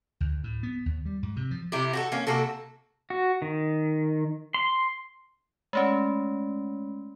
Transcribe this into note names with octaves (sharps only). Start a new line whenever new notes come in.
D2
A2
B3
D#2
G3
G#2
C3
F3
C3 E4 G4
F#4 G4 A4
A#3 C#4
C3 A#3 F#4 A4
F#4
D#3
C6
G#3 A3 C#4